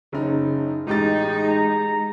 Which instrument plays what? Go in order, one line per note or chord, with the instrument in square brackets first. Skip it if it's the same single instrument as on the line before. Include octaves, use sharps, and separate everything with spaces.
[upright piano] F#1 D#4 [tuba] C#3
[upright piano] A1 G4 A6 [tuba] G#3 [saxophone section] D#4
[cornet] A#5